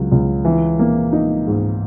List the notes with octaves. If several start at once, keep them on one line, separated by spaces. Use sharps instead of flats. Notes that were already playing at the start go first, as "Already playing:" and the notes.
Already playing: C#2 F#3
C#2
E3
A#3
D#4
G#2